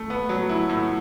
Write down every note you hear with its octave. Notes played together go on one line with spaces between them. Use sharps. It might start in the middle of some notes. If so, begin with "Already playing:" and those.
Already playing: A3
B3
F#3
E4
A2